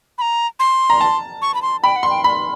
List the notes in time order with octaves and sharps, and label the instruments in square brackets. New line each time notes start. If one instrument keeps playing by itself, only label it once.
[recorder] B5
A#5
C6
[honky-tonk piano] A#5
A5
[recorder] C#6
B5
C6
[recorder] G5 [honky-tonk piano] B5
[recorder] F#5
[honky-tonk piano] C6
[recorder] G5
[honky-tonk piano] B5